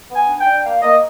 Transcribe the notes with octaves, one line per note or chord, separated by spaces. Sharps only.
B3
G#5
D4
G5
D4
A#3 F5
A#3 D#5